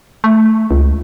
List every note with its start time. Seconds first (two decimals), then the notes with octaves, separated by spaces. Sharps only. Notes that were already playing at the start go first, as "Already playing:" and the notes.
0.24 A3
0.71 C#2